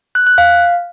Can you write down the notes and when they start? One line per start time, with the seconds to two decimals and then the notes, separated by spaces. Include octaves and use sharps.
0.15 F#6
0.27 F#6
0.38 F5